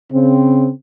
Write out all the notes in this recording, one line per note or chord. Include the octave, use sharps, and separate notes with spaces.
C#3 C4